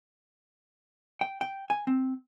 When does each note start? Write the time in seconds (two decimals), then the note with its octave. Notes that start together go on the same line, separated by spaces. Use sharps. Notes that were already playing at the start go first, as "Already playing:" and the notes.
1.21 G5
1.41 G5
1.70 G#5
1.87 C4